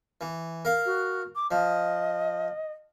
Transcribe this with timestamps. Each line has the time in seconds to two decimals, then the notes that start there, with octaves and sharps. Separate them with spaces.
0.21 E3
0.65 A#4 F5
0.85 F#4
1.35 D6
1.51 F3 D#5